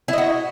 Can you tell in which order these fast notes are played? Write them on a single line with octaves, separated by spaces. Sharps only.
E4 D#5 F#4